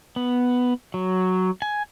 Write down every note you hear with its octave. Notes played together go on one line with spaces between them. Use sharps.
B3
F#3
G#5